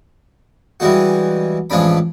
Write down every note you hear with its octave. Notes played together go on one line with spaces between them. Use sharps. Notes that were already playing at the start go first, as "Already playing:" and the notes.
E3 G3 G#3 F#4
A1 F3 G#3 D4 B5